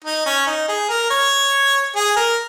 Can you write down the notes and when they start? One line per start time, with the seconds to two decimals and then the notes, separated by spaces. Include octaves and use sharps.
0.04 D#4
0.26 C#4
0.47 D#4
0.68 G#4
0.89 A#4
1.10 C#5
1.96 G#4
2.16 A#4